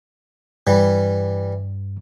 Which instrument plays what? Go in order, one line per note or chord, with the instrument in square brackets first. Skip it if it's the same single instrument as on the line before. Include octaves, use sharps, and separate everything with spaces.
[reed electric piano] G2 [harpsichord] E3 G3